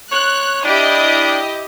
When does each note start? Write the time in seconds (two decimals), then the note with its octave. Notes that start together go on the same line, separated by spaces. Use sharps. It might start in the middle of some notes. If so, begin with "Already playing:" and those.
0.12 C#5 F#6
0.65 D4 E4 G4 D#5